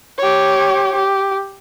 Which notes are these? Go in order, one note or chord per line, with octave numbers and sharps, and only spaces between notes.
G4 C#5
G4